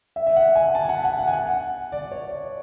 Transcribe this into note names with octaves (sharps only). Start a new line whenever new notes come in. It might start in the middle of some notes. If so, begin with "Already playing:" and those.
E5
E5
F#5
G#5
G#5
A5
G#5
F#5
F#5
F#5
G#5
F#5
D5
C#5
D5